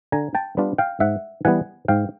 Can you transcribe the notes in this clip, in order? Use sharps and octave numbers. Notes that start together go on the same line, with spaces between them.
D3 G#5 A#5
G5 A5
G3 B3 D4 F4
F5 G5
G#2 E5 F#5
E3 G3 B3 F#5 G#5
G#2 F5 G5